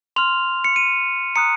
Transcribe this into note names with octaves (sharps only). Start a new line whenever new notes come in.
C6 F6 F7
C#7
D#7
A#5 D#6 F#6 C#7